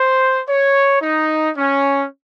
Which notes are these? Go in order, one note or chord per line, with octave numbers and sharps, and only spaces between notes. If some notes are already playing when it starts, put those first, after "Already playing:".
Already playing: C5
C#5
D#4
C#4